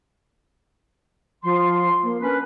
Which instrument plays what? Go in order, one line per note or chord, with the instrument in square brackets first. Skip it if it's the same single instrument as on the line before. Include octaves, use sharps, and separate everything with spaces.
[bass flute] F3 [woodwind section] C6
[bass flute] A#3
[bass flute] C#4 [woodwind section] D4 A#4 B4